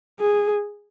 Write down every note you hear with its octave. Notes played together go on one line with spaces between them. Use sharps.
G#4